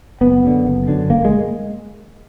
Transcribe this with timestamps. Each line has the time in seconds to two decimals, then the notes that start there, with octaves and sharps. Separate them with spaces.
0.21 F#1 B3
0.44 F#2 D3
0.65 F#1
0.88 F#2 D3
1.10 G1 A#3
1.25 G#3